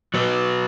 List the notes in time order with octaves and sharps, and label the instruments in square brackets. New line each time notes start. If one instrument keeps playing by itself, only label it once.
[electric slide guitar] F#3 B3 F#4 B4